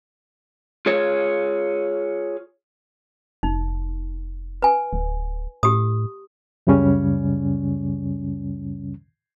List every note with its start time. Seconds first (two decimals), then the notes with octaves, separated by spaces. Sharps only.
0.86 F4 G#4 C#5
3.43 F1 D#4
4.62 B4 G#5
4.93 D1
5.63 A2 G4 D#6
6.67 C#2 F#2 C#3 G3 C#4